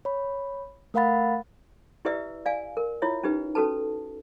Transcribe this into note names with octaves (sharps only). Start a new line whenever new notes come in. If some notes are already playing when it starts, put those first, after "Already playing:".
C#5 B5
A3 A#4 F5 F#5 B5 A6
E4 G4 B4 D5 E5 E6
D5 F5 G#5
A#4
E4 F4 C#5 E5
C#4 D#4 G4 B4
C#4 F#4 A4 B4 A5